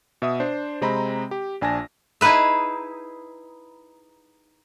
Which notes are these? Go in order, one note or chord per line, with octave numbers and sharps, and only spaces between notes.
B2 E5 D#6
D4 C5
C3 G#3 C4 D#5 A#5 B5
G4
A#1 D4 G#5 A5 A#6
D#4 E4 G#4 B4 E5